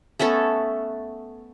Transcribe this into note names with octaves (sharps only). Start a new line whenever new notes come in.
A3 B3 C#4 A4